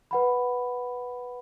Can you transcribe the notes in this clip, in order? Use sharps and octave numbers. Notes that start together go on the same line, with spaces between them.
B4 F#5 B5